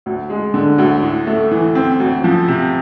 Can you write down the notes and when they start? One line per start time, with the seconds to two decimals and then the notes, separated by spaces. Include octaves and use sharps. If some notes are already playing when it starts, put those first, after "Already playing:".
0.06 D2
0.30 G#3
0.54 D3
0.78 D2
1.02 A2
1.27 A3
1.51 E3
1.75 C4
2.00 D2
2.24 F3
2.48 C3